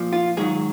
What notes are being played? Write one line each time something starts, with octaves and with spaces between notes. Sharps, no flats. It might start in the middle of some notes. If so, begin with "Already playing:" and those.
Already playing: A#2 F3
F4
G#2 D#3 F#3 G#4